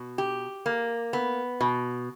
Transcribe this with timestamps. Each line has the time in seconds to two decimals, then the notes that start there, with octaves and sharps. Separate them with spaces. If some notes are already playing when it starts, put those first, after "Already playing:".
Already playing: B2
0.18 G4
0.66 A#3
1.13 B3
1.61 B2